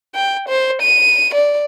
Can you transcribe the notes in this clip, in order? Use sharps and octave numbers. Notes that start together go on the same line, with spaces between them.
G5
C5
D#7
D5